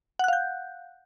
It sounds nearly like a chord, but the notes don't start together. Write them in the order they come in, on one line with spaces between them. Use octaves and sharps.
F#5 F#6 F5 G6